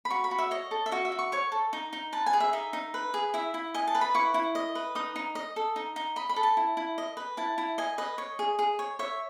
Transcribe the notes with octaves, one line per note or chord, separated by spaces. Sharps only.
B5
F#4 C#6
B5
F#4
E5
C#5 D#5
A4
E5
F#4 D#5
E5
F#4
C#6
C#5 C#6
A4
D#4
D#4
B4 A5
G#5
G#4
E5
D#4 E5
D#4
B4
G#4
E4 E5
E4
D#5 G#5
A5
B4
B5
E4 C#6
E4
D#5
B4
D#4 D#6
D#4
D#5
A4
D#4
D#4
D#5 B5
B5
A4
A5
E4
E4
D#5
B4
E4 A5
E4
D#5 G#5
B4 D#5
C#5
G#4
G#4
C#5
C#5 E5